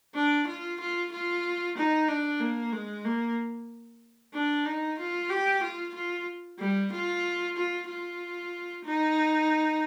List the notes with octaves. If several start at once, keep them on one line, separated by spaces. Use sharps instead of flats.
D4
F4
F4
F4
D#4
D4
A#3
G#3
A#3
D4
D#4
F4
G4
F4
F4
G3
F4
F4
F4
D#4